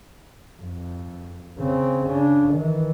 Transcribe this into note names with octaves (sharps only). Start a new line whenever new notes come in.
F2
C#3 C4
C#3 D4
D#3 E3